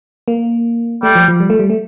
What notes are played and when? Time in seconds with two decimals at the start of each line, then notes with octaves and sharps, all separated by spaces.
0.28 A#3
1.03 G3 A3
1.15 F3
1.28 F3
1.40 G3
1.50 A3
1.59 G3
1.70 A3